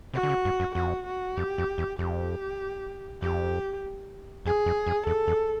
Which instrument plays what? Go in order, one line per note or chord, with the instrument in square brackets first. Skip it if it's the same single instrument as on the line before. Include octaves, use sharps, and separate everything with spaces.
[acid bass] C3 [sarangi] F#4
[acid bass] D3
C#3
G2
F#2
[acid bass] F2 [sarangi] F#4
[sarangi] F#4
[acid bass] F2 [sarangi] G4
[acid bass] F2
E2
[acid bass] F2 [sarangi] G4
[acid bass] F2 [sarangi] G4
[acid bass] F2 [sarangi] G#4
[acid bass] F2
F2
[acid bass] E2 [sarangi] A4
[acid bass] E2